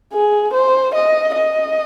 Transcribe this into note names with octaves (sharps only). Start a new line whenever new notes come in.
G#4
C5
D#5
D#5